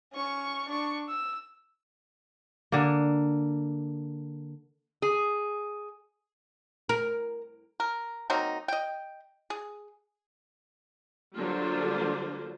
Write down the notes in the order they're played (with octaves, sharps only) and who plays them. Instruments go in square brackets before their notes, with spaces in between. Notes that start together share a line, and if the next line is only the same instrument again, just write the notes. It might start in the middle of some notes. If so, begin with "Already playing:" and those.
[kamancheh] C#4 C#6
D4 C#6
E6
[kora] D3 A#3
[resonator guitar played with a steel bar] G#4
[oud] A#4
[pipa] A#4
F#3 A#3 C4 D#4
D#5 G5
G#4
[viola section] D3 F#3 G3 A#3 F4 C5